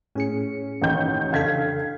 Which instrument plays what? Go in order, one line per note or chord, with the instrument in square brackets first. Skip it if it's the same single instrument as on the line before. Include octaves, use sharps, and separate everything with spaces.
[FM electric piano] A2 G#4 C#7 [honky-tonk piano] C#4
[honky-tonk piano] A1 D#3 G6
[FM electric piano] C#3 D4 A4 [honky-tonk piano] F5 G#6 B6